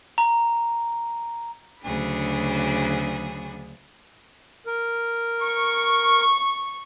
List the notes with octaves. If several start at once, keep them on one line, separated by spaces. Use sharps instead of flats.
A#5
D2 C#3 F#3 D4 G#4 B5
A#4
C#6